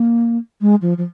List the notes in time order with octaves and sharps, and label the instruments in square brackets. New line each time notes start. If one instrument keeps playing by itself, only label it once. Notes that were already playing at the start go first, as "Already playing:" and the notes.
Already playing: [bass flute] A#3
G#3
F3
F3